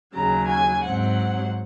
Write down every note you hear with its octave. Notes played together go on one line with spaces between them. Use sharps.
D#2 C#3 F#3 A#5
G#5
G#2 F#3 C4 F#5